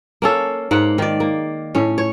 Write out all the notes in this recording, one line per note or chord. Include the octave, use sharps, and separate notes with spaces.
A#3 C#4 A4
G#2 A#3 F#5
D#3 D5
A#3
A2 C#4
C#5